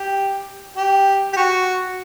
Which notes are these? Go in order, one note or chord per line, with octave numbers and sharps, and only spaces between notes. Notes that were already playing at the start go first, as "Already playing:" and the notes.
Already playing: G4
G4
G4
F#4